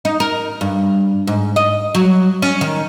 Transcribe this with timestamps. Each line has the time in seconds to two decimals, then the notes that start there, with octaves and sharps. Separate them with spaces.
0.05 D#4
0.20 A#4
0.61 G2
1.27 G#2
1.56 D#5
1.95 F#3
2.42 C#4
2.61 D#3